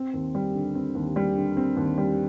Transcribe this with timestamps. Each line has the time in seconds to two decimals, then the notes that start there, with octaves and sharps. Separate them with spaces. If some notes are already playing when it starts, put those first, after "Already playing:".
Already playing: C4
0.14 D#2
0.35 G3
0.55 D3
0.75 C4
0.95 D#2
1.16 G3
1.36 D3
1.57 C4
1.77 D#2
1.98 G3